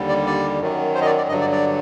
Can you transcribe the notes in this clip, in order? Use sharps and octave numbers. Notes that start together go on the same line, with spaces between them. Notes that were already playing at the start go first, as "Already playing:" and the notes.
Already playing: D#2 D3 G3
D5
D5
F#2 D#3 F#3
C5
D#5
D5
D5
G2 D3 F#3 D#5
D5
D5